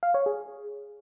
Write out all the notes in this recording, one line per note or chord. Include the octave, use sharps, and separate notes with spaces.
F5
C#5
G#4